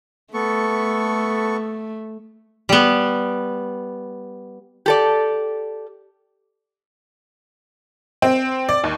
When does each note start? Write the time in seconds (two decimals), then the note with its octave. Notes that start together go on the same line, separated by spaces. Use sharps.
0.34 A3 B3 A4 C#6
2.69 G3 B3
4.86 G4 A4 D5
8.22 C4
8.69 D5
8.84 D#2